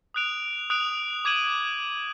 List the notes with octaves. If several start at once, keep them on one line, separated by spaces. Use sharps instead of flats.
D#6 F#6 D7 F7
D#6 F#6 D7 F7
D6 G#6 D#7 F#7